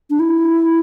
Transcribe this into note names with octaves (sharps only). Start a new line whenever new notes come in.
D4
E4